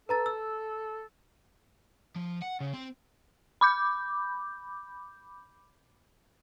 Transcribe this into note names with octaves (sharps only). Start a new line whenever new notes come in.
A4 B4 A#5 A6
E6
F3
F#5
C#3
C4
B5 D6 G6